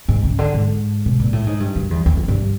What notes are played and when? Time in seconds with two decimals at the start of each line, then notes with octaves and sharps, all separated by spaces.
0.09 G#2
0.24 C#3
0.39 D3
0.54 G#2
1.06 B2
1.20 A#2
1.33 A2
1.47 G#2
1.60 G2
1.76 F#2
1.91 E2
2.06 E2
2.17 F2
2.28 G2